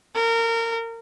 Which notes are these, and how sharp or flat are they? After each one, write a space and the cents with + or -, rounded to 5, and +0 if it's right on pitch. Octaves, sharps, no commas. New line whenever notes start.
A#4 -25